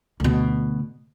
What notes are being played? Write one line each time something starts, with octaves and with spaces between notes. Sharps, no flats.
D2 B2